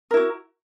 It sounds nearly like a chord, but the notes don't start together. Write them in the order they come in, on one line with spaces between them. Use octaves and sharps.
A#4 E4 F#4